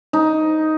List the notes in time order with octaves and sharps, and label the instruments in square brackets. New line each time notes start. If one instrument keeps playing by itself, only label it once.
[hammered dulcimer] D#4